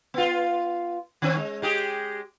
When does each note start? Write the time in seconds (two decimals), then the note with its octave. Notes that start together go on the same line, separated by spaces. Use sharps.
0.14 B3 F4
1.22 D#3 C4 C#4
1.37 G#3
1.62 G#3 G4 G#4